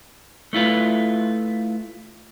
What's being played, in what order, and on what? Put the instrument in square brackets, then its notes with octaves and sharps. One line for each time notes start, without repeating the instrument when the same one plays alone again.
[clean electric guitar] A3 E4 F4 B4